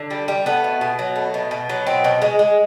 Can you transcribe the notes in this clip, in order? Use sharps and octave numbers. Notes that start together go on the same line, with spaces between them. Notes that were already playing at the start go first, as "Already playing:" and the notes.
Already playing: D3
G3
G3
A3 B3
B2
B2
F#3
A3
B2
B2
F#3
B2 C4
B2
G#3
G#3